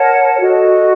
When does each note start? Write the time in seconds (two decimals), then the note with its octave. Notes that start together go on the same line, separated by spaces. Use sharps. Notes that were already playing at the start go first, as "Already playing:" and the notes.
Already playing: A#4 C#5 F#5 A5
0.39 F#4 A4 D#5